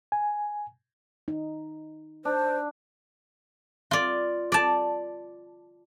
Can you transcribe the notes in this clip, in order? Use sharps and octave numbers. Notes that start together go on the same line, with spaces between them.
G#5
D#4
D4 C5
F4 D5
D5 A5